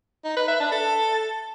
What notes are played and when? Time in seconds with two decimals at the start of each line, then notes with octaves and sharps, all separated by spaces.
0.25 D#4
0.36 B4
0.48 E5
0.60 D4
0.72 A4